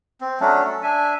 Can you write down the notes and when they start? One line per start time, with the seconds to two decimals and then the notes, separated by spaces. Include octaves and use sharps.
0.21 C4
0.40 F#3 A3 C#4 D4
0.64 A4
0.83 D4 E5 G#5